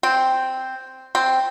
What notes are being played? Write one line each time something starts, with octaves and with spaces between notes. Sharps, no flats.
C4
C4